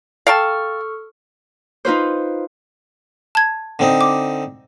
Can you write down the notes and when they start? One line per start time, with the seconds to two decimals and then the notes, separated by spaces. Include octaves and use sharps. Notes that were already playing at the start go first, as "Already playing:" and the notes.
0.27 A4 F5 G5 A5 C#6 F6
1.85 D#4 F4 B4 C5
3.35 A5 G#6
3.79 D3 C4 D#4
4.01 D6